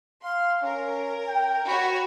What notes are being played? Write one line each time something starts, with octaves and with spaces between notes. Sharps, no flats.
F5 C6
C#4 A#4
G5
F#4 C#5 B5